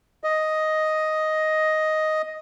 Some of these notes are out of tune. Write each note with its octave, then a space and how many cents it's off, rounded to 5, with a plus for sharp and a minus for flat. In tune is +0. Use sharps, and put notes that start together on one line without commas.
D#5 +5